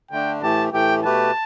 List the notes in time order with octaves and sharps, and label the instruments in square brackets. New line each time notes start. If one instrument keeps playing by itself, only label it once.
[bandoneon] D3 A3 D4 [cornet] G5
[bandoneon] A2 E3 A3 G4 [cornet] A5
[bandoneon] A2 E3 A3 G4 [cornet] G5
[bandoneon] B2 A3 G4 B4 [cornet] A5